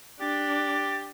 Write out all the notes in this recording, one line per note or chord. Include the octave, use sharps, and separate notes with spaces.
D4 G4 A6